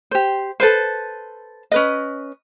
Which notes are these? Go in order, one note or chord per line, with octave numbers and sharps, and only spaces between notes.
G4 C5
A4 B4 C5
C#4 B4 D#5